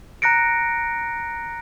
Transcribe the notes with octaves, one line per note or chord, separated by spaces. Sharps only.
A#5 F#6 A#6 C#7 D7